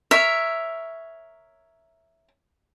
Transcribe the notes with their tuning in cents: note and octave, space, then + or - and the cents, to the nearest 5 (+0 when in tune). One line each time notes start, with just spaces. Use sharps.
A#4 +0 C#5 +0 E5 +0